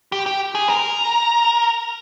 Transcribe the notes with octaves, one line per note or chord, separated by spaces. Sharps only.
G4
G4
G#4
A#4